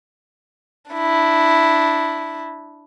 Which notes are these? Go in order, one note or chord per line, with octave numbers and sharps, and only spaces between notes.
D4 E4